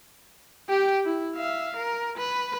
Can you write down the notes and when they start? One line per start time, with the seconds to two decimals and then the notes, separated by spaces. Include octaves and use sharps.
0.69 G4 G5
1.05 E4
1.36 E5 F5
1.77 A#4
2.18 B4